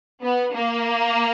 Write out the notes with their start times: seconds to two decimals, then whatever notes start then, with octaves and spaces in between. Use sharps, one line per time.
0.22 B3
0.53 A#3